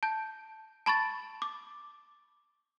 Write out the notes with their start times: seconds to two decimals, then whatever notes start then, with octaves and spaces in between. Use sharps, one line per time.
0.03 A5 G6
0.86 A5 B5 C#6 A6
1.42 D6